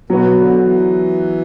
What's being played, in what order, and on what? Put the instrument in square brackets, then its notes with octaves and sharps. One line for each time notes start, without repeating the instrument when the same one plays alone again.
[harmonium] B2 [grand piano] F#3 B3 F#4
[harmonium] D3
E3